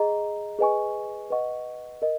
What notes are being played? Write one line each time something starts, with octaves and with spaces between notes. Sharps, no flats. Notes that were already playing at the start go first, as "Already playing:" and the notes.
Already playing: G#4 D#5 A#5
G#4 B4 D#5 G#5 C#6
B4 D#5 F#5 C#6
A#4 D#5